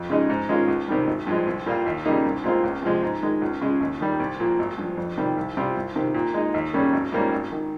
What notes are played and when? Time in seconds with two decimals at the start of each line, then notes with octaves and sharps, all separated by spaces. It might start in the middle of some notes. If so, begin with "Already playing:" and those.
Already playing: F2
0.10 C#3 G#3 D#4
0.30 G#2
0.49 D#3 G#3 C#4 F4
0.68 C#2
0.88 C3 D#3 G3
1.07 G#1
1.27 G2 F3 G#3
1.47 C2
1.66 A#2 G3 A#3 F4
1.86 D#2
2.05 C#3 G3 A#3 D#4
2.25 C2
2.44 A#2 G#3 C4 F4
2.64 C#2
2.82 C3 F3 G#3
3.03 G#2
3.23 D#3 G#3
3.41 C#2
3.61 C#3 G#3
3.81 D#2
4.01 D#3 G3
4.20 C2
4.40 A#2 F3 A#3
4.59 G#1
4.78 G2 F3
4.97 F2
5.18 C3 D#3 G3
5.37 C2
5.57 C3 G3 C4 F4
5.76 C2
5.96 C3 D#3
6.14 A#2
6.34 G#3 D#4
6.54 D#2
6.73 C#3 G3 A#3 C#4
6.93 G#1
7.12 G#2 G3 A#3 C#4
7.32 G#1
7.52 D#3